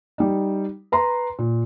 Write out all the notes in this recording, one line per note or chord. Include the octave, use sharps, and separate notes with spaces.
G3 D#4
B4 A#5 C6
A#2